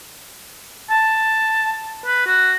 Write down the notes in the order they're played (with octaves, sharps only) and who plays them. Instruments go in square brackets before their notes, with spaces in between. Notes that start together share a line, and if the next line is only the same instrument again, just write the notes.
[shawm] A5
B4
F#4